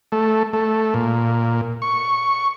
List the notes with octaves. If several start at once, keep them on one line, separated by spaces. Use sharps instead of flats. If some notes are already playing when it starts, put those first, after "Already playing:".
A3
A3
A#2
C#6